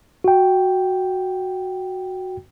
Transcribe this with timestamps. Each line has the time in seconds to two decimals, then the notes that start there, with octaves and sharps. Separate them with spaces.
0.24 F#4 G5